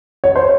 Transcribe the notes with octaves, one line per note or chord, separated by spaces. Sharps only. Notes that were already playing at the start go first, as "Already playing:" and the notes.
C#5
C5